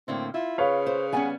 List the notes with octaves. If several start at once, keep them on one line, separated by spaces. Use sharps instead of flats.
A2 D3 A#3 C4
E4 F4
C#3 B4 C#5 F5
C5
G3 B3 C#4 F#5 G#5